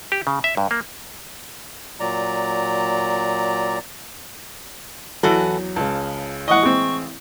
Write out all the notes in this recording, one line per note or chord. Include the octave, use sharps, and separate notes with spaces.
G4
C#3
E5
G2
A#3
A#2 F#3 D5 A#5
E2 E3 F#3 F#4 A4
C#2 C#3 A5
A1 E3 D#5 F#5 C#6
G#3 C4